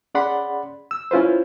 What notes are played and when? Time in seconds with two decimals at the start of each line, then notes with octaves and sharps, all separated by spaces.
0.15 C#4 G#4 D5 F#5 B5 C6
0.91 E6
1.11 C#4 E4 F4 B4 C5